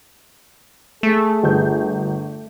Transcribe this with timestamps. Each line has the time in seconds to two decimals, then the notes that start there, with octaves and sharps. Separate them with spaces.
1.03 A3 G#4
1.44 G1 G6